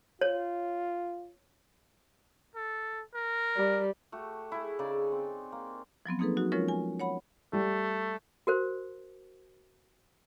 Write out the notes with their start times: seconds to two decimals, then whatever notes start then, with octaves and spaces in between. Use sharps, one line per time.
0.21 F4 C#5
2.55 A4
3.15 A#4
3.56 G3
4.12 A3 F#4 G4
4.52 E4 G#4
4.79 C#3 D#4 D5
5.12 C4
5.52 A#3
6.06 F3 F#3 B3 C4
6.19 A#3 C4 D#4 G#4 A4 B4
6.37 F#3 D#4 F#4
6.52 F3 G#3 C#4 F4 A#4 C#5
6.68 G#5
7.00 C#5 F#5 B5
7.53 G3 A3
8.47 F#4 A#4 C5